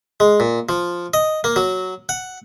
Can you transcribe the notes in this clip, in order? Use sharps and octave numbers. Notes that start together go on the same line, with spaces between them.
G#3
A#2
F3
D#5
A#3
F#3
F#5